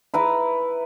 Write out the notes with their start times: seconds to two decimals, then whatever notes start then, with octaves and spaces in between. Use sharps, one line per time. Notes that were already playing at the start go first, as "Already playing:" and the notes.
0.14 E4 B4 A#5